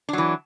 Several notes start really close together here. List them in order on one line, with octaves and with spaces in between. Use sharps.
D4 F#3 E3